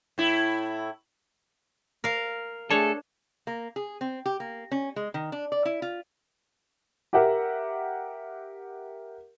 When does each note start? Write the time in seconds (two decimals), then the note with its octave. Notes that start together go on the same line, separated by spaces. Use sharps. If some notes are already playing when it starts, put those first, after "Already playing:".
0.18 A2 E4
2.04 A#4 F5
2.70 A3 D4 G#4 A4 C#5
3.47 A#3
3.76 G#4
4.01 C4
4.26 G4
4.40 A#3
4.71 C#4
4.96 G#3
5.14 D#3
5.32 D4
5.52 D5
5.65 E4
5.82 F4
7.13 G4 A#4 E5 F#5